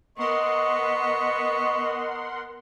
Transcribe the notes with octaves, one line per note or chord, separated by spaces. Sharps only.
B3 A#4 D#5 F#5 C6 C#6